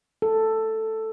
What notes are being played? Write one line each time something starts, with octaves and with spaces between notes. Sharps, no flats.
A4